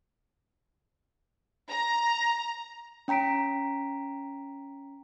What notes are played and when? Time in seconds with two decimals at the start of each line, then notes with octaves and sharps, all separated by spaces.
1.70 A#5
3.08 C#4 G5 A#5 B6 D7